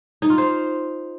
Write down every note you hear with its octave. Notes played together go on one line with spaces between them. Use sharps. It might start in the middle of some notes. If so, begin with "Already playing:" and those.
D#4
F4
C5